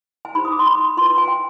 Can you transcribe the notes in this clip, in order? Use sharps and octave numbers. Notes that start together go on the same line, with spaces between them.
G#5
D#4 G4 C5 B5
D#6
D6
C6
B5
F4 B4 C6
C6
G#5
G5